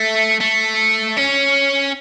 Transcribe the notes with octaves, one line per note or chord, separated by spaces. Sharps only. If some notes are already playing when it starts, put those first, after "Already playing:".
Already playing: A3
A3
C#4